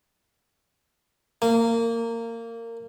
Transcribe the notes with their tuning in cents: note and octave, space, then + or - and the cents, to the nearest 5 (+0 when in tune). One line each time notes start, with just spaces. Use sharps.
A#3 -20